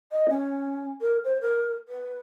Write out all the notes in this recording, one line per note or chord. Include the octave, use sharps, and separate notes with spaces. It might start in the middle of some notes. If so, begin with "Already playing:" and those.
D#5
C#4
A#4
C5
A#4
B4